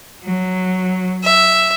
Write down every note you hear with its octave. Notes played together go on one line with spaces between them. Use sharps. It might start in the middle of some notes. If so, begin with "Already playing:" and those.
F#3
E5